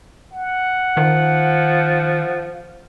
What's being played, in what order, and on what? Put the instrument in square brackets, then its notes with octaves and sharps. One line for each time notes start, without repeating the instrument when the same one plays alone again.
[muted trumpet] F#5
[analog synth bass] D#3 [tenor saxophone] F3